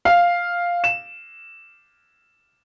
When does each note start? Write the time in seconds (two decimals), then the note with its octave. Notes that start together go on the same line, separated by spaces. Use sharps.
0.05 F5
0.84 E7